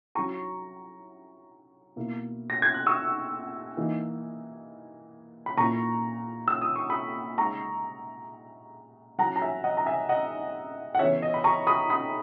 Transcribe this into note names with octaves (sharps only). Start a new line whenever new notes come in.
F#3 C#4 E4 A#5 C#6
B2 A#3 E4
A#6
G#6
F#6
C#6 E6
E3 A#3 D#4
B5
A#2 A#3 E4 A#5 C#6
E6
D#6
C#6
B5 D#6
C#3 G#3 D#4 A#5 C#6
F#3 C#4 E4 F#5 A#5
A#5
E5 G#5
D#5 F#5
A#5
E5 G#5
D#5 F#5
F#5
C#3 E3 B3 C#5 E5
D#5
B5
A#5 C#6
B5 D#6
B5 D#6